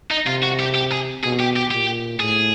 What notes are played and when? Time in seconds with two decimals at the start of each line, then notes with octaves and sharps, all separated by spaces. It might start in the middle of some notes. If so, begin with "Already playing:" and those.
0.11 D#4
0.26 C3 F4
0.43 F#4
0.59 G4
0.75 G4
0.92 G#4
1.23 B2 G#4
1.39 G4
1.56 G4
1.71 A#2 G4
2.20 A2 G#4